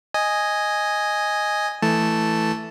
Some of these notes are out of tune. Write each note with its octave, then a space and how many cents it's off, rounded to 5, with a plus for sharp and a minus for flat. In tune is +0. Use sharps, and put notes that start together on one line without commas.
D#5 +0 G#5 +0
E3 +0 A3 +0 A5 +0